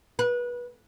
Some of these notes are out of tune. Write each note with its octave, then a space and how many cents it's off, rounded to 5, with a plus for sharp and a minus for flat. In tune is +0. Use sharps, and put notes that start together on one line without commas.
B4 -25